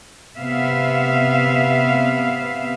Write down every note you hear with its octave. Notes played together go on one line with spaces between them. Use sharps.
C3 B3 E5 F5